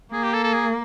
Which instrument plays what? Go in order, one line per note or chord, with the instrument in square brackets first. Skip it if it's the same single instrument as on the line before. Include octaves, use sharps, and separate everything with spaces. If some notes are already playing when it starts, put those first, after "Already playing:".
[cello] A#3 [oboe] G#4
[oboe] G4
A4
A4
G#4